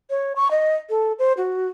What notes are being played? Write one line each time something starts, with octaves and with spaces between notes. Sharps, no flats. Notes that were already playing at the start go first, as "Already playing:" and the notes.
C#5
C#6
D#5
A4
C5
F#4